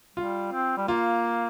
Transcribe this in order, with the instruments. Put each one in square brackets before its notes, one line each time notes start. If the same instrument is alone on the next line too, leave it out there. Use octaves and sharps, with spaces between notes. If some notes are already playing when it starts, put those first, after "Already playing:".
[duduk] G3 [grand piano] F4
[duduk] C4
G3
[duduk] A#3 [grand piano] F4